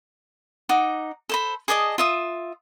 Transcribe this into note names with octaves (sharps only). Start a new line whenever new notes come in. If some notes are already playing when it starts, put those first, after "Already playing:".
D#4 F#5 A#5 D6
A4 C5 B5
G#4 D5 D#5 A5
F4 E5 D#6